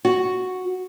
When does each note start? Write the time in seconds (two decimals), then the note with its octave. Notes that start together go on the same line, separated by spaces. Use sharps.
0.05 F#4